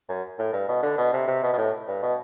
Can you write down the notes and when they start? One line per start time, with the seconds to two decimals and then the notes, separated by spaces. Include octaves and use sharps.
0.09 F#2
0.39 A2
0.53 G2
0.68 B2
0.83 D3
0.98 B2
1.13 C3
1.27 C3
1.43 B2
1.53 B2
1.58 A2
1.87 G2
2.03 B2